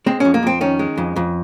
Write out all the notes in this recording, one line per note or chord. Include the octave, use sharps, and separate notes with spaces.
G#3 C4
F2 C#4
A#3
F2 C4
D#3 C#4
G#3
F2
F2